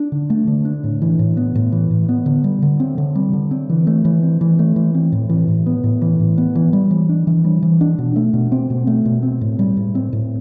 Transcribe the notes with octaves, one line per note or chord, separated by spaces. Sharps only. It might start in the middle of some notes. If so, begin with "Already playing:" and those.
Already playing: D4
D3
A3
D3
D4
A2
E3
A2
B3
A2
E3
A2
B3
D3
G3
D3
C4
D3
G3
D3
C4
E3
A3
E3
C4
E3
A3
E3
C4
A2
E3
A2
B3
A2
E3
A2
B3
E3
G3
E3
D4
E3
G3
E3
D4
B2
A3
B2
C4
B2
A3
B2
C4
A2
G3
A2
C4
A2